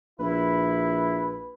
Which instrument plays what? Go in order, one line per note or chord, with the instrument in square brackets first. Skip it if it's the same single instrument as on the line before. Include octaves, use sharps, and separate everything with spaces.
[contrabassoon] A#1 [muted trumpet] E4 [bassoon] B4